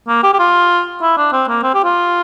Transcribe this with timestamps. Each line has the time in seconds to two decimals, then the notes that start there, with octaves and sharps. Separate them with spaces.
0.08 A#3
0.23 G4
0.34 G4
0.39 F4
1.02 E4
1.17 D4
1.33 C4
1.48 A#3
1.63 C4
1.74 G4
1.84 F4